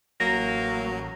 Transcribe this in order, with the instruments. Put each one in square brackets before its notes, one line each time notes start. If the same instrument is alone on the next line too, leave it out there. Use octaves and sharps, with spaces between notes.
[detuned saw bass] A1 [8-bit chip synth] F#3 [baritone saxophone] A#3 [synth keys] A#6